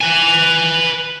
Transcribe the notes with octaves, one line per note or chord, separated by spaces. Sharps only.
B4 G#5